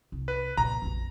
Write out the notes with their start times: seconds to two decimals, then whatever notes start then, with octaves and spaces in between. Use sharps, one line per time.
0.12 C2
0.28 B4
0.57 A#2 D3 A#5
0.82 A#1 F2